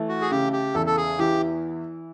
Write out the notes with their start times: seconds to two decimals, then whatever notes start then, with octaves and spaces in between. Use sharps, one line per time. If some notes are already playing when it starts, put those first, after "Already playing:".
Already playing: E3 A3
0.09 F#4
0.21 G#4
0.31 C#3 G4
0.53 G4
0.74 E2 A4
0.86 A4
0.97 G#4
1.19 E3 G4